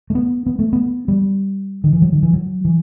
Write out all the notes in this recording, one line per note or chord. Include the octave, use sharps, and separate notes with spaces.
A3
B3
B3
A3
B3
G3
D#3
E3
F#3
D#3
E3
F#3
E3